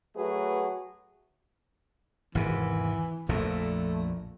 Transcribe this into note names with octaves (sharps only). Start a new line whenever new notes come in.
F#3 A3 F#4 G#4 B4
G#1 E2 C3 E3
A#1 F2 A#2 A3